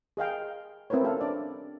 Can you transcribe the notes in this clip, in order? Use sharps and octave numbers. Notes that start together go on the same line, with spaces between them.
G#4 D#5 F5 G5
C4 E4 A#4 B4 C#5
C#4 A4 F5
D4 D5